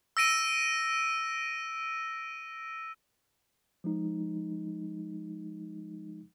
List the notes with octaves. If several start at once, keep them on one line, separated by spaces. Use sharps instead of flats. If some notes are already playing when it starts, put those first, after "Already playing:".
E6 A#6 D7 D#7
F3 G#3 D#4